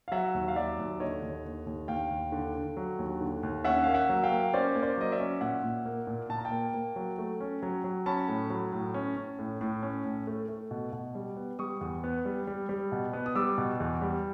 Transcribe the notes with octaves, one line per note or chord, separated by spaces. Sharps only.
F5
F#3 E5 F#5
D#2
F5
F#3 D5 E5
D#2
D3 C#5 D#5
D#2
D3
D#2
D#2 F5 G5
D#2
D3
D3
F#3
D#2
D3
D#2
C#4 E5 F#5
A#3 F5
E5 F#5
F#3
F5 G5
A#3
C#4 C5 D5
A#3
C5 D5
F#3 D#5
D5 E5
C#4
A#2 E5 F#5
A#2
A#3
A#2
A#2 A5
A#5
G5 A5
A#3
A#3
F#3
A3
C#4
F#3
F#3
C#4 A5 B5
A2
F#3
A2
C#4
C#4
A2
A2
C#4
A2
A3
A3
B2
B2
G3
B3
G3 C#6 D#6
E2
B3
G3
G3
G3
B2
B3
D#6
G3 D6 E6
B2
E2
G3